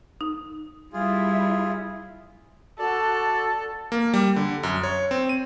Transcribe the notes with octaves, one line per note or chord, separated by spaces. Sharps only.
D#4
G3 E4 F4 G#4
F#4 A4 D5 A5
A#3
G3
D3
F#2
C#5
C4
D#7